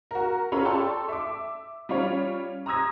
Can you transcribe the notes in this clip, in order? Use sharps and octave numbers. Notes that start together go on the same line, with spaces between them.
F#4 A#4
C#4 F4 A4 C#5 A#5 B5
A4 D5 G5 A5 C6 C#6
E5 D6
G3 C#4 F4 C#5
A#5 C6 D#6 E6 G#6 A#6